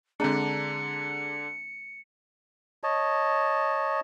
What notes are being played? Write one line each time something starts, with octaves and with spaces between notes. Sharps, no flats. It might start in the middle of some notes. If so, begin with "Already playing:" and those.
D3 G#3 C4 D4 G#4 A#5 C#7
C#5 D#5 A5